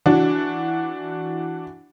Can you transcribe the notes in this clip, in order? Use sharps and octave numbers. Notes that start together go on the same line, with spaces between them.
E3 D4 F#4